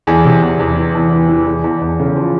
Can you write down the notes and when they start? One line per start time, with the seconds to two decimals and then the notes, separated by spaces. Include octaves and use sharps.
0.07 E2 G#4
0.25 C3
0.42 E2
0.59 E2
0.77 E3
0.94 E2
1.12 E3
1.29 E3
1.46 E2 G#4
1.64 E2
1.81 E2
1.99 C#3
2.16 F3